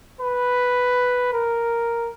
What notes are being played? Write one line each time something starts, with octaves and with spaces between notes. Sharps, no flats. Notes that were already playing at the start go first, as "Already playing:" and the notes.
B4
A#4